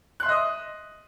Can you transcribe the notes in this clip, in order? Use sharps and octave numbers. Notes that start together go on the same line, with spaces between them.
D#5 E5 C6 D#6 F#6